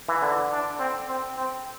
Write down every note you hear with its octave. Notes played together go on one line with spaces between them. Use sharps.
E3
D3 E4
D4
C4
C4
C4